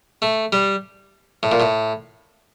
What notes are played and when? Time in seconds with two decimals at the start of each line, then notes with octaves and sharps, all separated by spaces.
0.22 A3
0.52 G3
1.43 A2
1.52 A#2
1.60 A2